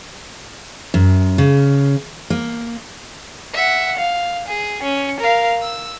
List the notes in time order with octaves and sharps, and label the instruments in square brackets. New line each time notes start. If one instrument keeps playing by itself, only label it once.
[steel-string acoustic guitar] F#2
C#3
A#3
[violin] E5 F#5
F5
G#4
C#4
A#4 F5
E6